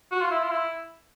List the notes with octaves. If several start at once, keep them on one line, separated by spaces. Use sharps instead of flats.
F#4
F4
E4
F4
E4